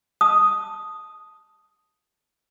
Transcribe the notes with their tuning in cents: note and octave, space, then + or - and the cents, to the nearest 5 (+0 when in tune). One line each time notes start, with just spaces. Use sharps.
A5 +0 D#6 +0